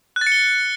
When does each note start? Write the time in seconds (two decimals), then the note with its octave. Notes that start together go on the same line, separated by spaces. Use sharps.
0.16 F#6
0.21 A6
0.27 C#7
0.32 G7